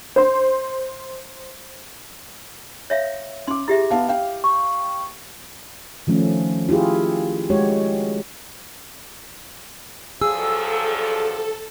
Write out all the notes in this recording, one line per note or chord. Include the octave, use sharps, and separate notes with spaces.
C5 C6
C#5 E5 F5
C#4 C6 D6
E4 G4 G#4 E5
B3 F5 A5
F5 G5
C#6
D#3 F3 A3 C#4
E4 F4 G4 G#4
G#3 F#4 G4 C#5
G2 F3 F#3 G#4 A4 E6